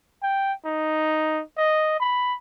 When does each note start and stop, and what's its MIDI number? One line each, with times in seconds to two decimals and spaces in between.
0.22 0.53 79
0.65 1.42 63
1.57 1.96 75
2.00 2.36 83